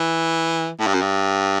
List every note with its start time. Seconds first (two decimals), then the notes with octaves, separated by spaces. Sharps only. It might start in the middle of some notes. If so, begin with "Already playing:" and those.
Already playing: E3
0.79 A2
0.87 G2
0.94 F#2
1.02 G2